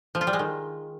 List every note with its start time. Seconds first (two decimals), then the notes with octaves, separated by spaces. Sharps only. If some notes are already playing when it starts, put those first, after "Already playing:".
0.15 F3
0.21 F4
0.27 G3
0.33 G#3
0.39 D#3